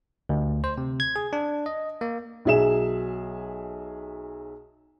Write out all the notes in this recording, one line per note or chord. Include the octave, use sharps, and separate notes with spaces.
D2
C5
C3
G#6
G#4
D4
D#5
A#3
B1 F#3 G#4 E5 E7